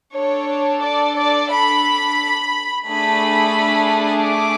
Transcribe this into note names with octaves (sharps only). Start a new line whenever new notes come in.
D4 A4 C#5
D5
D5
B5
A3 D4 G#4 B5
D6